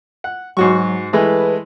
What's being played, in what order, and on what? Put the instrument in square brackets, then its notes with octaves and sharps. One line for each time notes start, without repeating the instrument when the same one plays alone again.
[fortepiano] F#5
[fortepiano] G#2 F#4 C#6 [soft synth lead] F#3
[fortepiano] E3 G#3 A3 [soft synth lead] B4